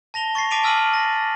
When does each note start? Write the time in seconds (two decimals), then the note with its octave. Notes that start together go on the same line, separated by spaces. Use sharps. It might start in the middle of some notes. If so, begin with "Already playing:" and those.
0.14 A5 A#6 F7 G7
0.35 C#6 A6 A#6 C7
0.51 A5 D6 B6 D7 D#7 F7
0.64 G#5 E6 F6 B6 D#7 F#7
0.94 A6 A#6